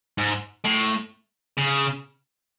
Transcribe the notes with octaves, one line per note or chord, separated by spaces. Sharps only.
G#2
A2
C#3